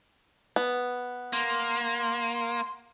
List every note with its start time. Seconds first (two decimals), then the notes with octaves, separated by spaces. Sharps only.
0.56 B3
1.33 A#3 C6